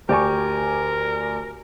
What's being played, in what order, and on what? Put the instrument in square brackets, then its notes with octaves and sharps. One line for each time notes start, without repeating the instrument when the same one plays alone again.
[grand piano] D2 D5 G#5 [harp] G4 C#6 [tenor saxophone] A#4